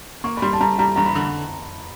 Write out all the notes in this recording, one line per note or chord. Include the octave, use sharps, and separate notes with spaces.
A#3 C#6
B5
G3 C6
A5
G3 A#5
G3 A#5
G2 A#5
B5
D3